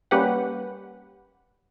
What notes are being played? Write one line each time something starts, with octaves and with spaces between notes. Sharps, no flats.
G3 A#3 C#4 G4 B4 F#5